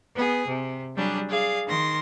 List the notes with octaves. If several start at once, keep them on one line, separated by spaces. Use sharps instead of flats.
B3 G#4
C3
F#3 G3 D4 G#4
G#4 D5 F5
D#3 C6 A#6